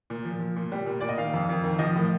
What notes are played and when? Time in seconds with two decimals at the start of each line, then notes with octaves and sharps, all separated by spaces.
0.10 A#2
0.25 F3
0.40 F3
0.56 A#2
0.72 G3
0.86 A#2
1.01 A#2 D5
1.09 D#5
1.18 D#3 F5
1.33 F2
1.49 F2
1.63 D#3
1.79 F3 D#5
1.95 A2